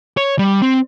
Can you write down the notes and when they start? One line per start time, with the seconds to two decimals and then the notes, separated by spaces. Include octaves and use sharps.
0.17 C#5
0.39 G3
0.62 C4